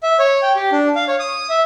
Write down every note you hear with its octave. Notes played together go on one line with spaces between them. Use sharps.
E5
C#5
G5
G4
D4
F5
C#5
D#6
E5